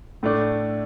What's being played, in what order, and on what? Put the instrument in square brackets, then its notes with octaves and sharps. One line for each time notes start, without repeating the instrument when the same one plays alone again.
[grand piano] A2 A3 D4